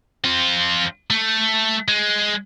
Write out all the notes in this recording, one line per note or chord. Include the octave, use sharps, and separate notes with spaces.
C4 F4
A3
G#3